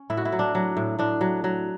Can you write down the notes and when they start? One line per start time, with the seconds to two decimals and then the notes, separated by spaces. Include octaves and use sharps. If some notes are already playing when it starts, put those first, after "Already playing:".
Already playing: C#4
0.10 A2 E4
0.17 F#4
0.25 E4
0.32 F#3
0.39 D4
0.55 F#3
0.77 A2
0.99 A2 D4
1.21 F#3
1.44 F#3